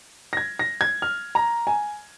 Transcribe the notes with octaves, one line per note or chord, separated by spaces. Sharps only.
A#6
G#6
A#6
G#6
F6
A#5
G#5